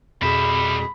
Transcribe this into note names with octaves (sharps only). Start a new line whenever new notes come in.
F2 B2 G3 G#4 E5 B5